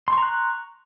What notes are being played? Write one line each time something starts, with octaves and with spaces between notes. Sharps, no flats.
A#5 C6 C#6 F#6